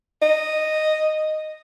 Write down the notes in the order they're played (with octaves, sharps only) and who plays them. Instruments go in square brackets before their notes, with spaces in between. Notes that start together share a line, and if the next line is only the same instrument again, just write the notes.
[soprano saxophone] D#5